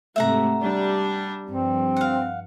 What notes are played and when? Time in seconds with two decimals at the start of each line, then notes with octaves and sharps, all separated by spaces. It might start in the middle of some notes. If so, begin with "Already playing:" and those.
0.16 G#2 C3 A3 E5 F#5 A#5
0.62 G3 D4
1.47 G2 F3 C4
1.97 F5 F#5